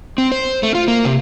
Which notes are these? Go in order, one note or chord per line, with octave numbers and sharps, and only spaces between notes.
C4
C5
A3
F4
A#3
C3